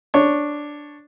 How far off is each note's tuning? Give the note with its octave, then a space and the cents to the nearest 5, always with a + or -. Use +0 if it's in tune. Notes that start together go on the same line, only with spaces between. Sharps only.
D4 +0 C#5 -5